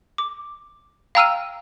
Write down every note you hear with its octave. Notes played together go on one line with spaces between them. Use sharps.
D6
F5 G5 A#5 E6 F6 D#7